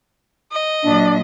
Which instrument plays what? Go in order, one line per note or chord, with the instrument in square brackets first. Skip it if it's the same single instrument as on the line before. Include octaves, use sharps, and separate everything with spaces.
[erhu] D#5
[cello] A#2 F#3 [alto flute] D4